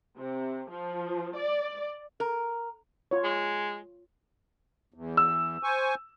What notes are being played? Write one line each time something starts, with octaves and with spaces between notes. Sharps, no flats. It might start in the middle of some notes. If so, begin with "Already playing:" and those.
C3
F3
D5
A#4
F4 C#5
G#3
E2
E6
C5 G#5 C#6